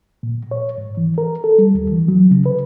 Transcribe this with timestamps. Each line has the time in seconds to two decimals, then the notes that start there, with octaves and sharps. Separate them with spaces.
0.23 A#2
0.51 C#5
0.78 G#2
0.97 E3
1.18 A#4
1.44 A4
1.58 G3
1.75 D#2
1.92 E3
2.08 F#3
2.31 C#3
2.46 B4